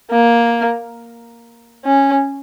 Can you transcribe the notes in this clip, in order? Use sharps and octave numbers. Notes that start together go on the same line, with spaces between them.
A#3
C#4